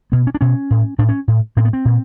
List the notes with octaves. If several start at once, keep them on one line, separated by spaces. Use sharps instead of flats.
B2 B3
C#4
D4
B2 C#4
A2
A2 D4
C#4
A2
A2 C4
B3
C4
A#2